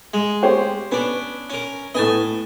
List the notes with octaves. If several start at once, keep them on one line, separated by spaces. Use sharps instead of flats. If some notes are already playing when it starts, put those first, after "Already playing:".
G#3
G4 C5 C#5
B3 C#4 D4
C#4 A#4
A2 B3 D#5 G#5 A5